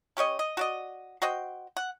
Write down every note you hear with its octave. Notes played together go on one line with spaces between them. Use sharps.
C#4 G4 C#5 D#5
D#5
F#4 D5 D#5
F#4 C5 D#5 G5
F#5